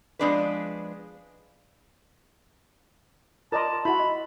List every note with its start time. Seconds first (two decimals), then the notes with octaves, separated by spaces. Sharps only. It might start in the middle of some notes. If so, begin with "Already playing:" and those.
0.19 F3 G#3 B3 D4 G#4 B4
3.52 F4 A#4 D5 D#5 A5 C6
3.85 E4 F#4 B5
3.99 D#5